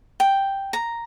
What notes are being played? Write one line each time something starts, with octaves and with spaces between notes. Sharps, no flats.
G5
A#5